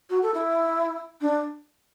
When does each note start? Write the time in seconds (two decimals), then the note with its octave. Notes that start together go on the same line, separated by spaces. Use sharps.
0.09 F#4
0.22 A4
0.34 E4
1.21 D4